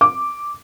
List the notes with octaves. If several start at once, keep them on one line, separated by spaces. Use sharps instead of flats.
D6